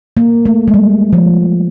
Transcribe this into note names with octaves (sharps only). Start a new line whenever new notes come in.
A#3
A3
G#3
G3
F3